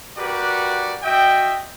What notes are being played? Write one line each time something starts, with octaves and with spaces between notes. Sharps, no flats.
F#4 G4 A#4 B4 D5 F#5
F#4 D#5 E5 G5